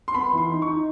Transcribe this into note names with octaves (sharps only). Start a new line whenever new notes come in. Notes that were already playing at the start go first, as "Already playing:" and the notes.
C6
B3 B5
E3 C6
D#4
C#6
D#4